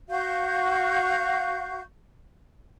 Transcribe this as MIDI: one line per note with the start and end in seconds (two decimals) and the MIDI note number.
0.10 1.81 66
0.10 1.81 77
0.10 1.81 85
0.10 1.81 91